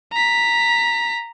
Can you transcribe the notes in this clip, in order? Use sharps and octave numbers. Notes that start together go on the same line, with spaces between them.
A#5 B6